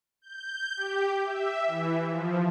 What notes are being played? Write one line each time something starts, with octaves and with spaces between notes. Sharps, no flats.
G6
G4
E5
E3
F3